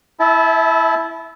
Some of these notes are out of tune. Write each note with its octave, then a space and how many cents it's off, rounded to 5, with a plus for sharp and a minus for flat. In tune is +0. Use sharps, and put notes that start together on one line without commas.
E4 +0 E5 -30 A5 -30